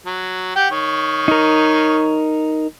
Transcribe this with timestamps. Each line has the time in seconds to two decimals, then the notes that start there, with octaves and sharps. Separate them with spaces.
0.06 F#3
0.56 G4 F#5 G5
0.71 D#3 C#5
1.28 D#4 A#4